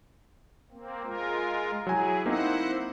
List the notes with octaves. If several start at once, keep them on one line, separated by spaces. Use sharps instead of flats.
A#3 C4
G#3 F4 A#4
F#3 E4 G#4 G#5
A#3 C4 D#4 E4 C5 F#5